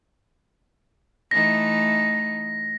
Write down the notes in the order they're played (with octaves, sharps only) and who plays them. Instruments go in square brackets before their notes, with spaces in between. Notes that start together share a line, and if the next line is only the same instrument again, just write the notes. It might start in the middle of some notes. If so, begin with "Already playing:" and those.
[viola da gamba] E3 A3 D#4 [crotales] A#6